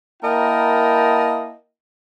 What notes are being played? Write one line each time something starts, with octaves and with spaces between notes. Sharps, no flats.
A#3 E4 A#4 D#5 G5 A5